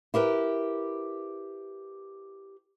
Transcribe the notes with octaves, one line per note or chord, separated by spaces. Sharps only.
E4 G4 A#4 B4